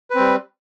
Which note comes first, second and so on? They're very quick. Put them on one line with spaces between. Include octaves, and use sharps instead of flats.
B4 C4 G3